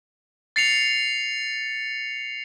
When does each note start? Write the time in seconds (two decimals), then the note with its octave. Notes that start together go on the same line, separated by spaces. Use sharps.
0.56 A6 C7 C#7 F7